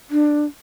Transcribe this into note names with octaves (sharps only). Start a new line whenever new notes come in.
D4